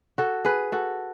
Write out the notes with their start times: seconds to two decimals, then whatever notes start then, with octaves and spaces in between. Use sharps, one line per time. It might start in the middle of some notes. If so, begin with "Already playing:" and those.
0.18 F#4 A4
0.45 G#4 B4
0.72 F#4 A4